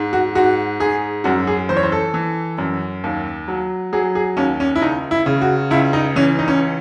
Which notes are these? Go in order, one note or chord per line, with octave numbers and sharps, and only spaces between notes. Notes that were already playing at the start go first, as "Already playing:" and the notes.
Already playing: G#2
F#4
G#2 F#4
G#2 G#4
F#2 F#4
G#4
E3 C5
C#5
C5
A4
E3
F#2
D#2
F#3
F#3 G#4
G#4
D#2 C#4
C#4
E4
C#2 D#4
E4
C#3
F#4
C#2 E4
D#4
E3 C#4
D#4
C#4